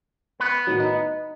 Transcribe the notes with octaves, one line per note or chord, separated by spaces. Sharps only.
B3 B4
A2 D#3 F#3
D#4